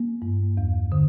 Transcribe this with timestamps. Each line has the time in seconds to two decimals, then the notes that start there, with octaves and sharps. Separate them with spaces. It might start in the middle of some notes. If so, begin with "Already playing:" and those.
Already playing: A#3
0.22 G2
0.57 E2
0.92 D3